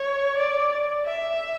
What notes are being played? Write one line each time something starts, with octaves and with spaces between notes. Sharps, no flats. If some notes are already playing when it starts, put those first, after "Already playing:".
Already playing: C#5
D5
E5